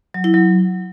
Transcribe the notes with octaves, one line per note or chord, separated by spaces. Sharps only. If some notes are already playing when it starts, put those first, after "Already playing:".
F#3
E4
F#3